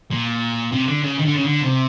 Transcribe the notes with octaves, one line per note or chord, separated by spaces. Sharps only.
A#2
C3
D3
C#3
D#3
D3
C#3
D3
C3